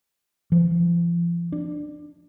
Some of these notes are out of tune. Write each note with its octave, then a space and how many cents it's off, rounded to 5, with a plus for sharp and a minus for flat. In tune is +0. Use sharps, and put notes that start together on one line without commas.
F3 -35
D4 +15